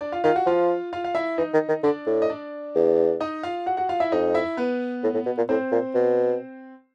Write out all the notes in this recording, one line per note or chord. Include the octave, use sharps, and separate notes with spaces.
D4 D5
F4 F5
D#3 F4 F5
F#4 F#5
F3 F4 F5
F4 F5
F5
E4 E5
E3 D#4 D#5
D#3
D#3
D3 D4 D5
A2
D#5
D4 D5
E2
D#4 D#5
F4 F5
F#4 F#5
F#4 F#5
F4 F5
E4 E5
F2 D#4 D#5
E4 E5
B3 B4
A2
A2
B2
A#2
A2 C4 C5
A#2
B2